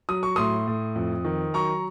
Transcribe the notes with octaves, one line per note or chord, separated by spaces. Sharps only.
F#3 D#6
C#6
A2 C6 D#6
A2
F2
D#3
F#3 A#5 C#6